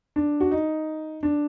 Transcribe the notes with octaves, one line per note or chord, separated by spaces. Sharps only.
D4
F#4
D#4
D4